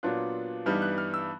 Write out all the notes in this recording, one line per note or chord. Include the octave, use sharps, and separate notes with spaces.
A#2 F#3 B3 D4 F4 F#6
G2 E3 G3 B3 D#4 F6
F#6
F6
E6